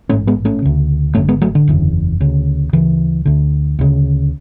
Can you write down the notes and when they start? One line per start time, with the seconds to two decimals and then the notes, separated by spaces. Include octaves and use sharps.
0.09 A1 G#2 A3 C#4
0.27 G#3 B3
0.45 A3 C#4
0.62 D2 C#3
1.15 G#1 F#2 D3 A3 C#4
1.28 G#3 B3
1.41 F#3 A3
1.55 D3
1.67 F#1 E2 C#3
2.21 D2 C#3
2.73 D2 C#3 E3
3.25 D2 D3
3.79 D2 C#3